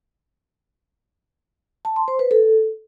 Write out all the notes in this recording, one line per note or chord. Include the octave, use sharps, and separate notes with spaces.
A5
C6
C5
B4
A4